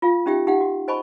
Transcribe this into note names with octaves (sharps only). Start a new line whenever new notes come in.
F4 F5
C#4 D#4 G4 E5 G5
D#4 G4 F5 F#5
F#4
C5 D#5 G#5 A5 B5 C#6